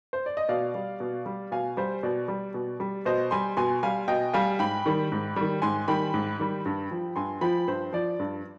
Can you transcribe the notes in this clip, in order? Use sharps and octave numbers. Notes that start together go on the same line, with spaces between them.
C5
D5
D#5
B2 D5 F5
G3
B2
G3
B2 F5 G#5
G3 C5
B2 D5
G3
B2
G3
B2 C5 D#5
G3 G#5 C6
B2 G#5 C6
G3 F5 G#5
B2 D#5 G5
G3 F5 G#5
G#2 G5 B5
D#3 G3
G#2
D#3 G3
G#2 G#5 C6
D#3 G3 G5 B5
G#2
D#3 G3
G2
F3
G2 G#5 C6
F3 G5 B5
G2 C5
F3 D5
G2